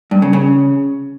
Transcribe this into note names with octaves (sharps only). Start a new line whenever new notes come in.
G2
C#3
C#3